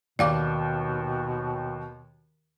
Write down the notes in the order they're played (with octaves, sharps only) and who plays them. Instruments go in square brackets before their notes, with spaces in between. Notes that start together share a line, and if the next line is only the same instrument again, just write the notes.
[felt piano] D#2 [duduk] B2 [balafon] D5 F5 D6